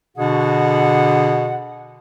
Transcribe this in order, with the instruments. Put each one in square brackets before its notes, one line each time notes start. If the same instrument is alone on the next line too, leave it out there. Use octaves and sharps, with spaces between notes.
[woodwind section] B2 D3 D4 F#4 G#4 F#5